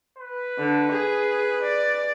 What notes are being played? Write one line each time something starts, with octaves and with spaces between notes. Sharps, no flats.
B4
D3
G#4
D5